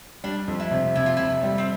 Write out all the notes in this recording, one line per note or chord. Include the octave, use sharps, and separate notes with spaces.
G3 D4
F2
E4
C3
C3 E4
F4
C3 E4
G3
C4